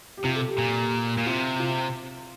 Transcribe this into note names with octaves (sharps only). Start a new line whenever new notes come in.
G4
C3 F4
A4
G4
A#2
A#2
C3 F4
F4